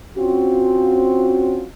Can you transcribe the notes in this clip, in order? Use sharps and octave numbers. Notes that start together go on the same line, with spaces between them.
C4 C#4 F4 F#4